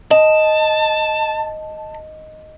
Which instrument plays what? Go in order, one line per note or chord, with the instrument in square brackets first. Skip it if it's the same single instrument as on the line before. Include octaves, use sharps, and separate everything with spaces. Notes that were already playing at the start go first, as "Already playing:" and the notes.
[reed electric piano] D#5 [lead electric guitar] A5